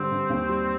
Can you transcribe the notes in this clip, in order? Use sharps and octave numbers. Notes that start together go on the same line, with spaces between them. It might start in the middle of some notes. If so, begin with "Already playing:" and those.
Already playing: G2 D3 G3 C4
G2
D#2
G3